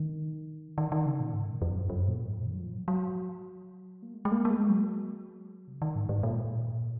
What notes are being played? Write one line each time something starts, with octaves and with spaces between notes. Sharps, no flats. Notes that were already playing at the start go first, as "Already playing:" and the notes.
Already playing: D#3
D#3
D#3
C#3
A#2
G#2
F2
F#2
F#2
A#2
G#2
D#3
F#3
F3
F#3
F#3
A#3
G#3
G#3
A#3
A#3
G#3
F#3
C3
C#3
D#3
G#2
G#2
A#2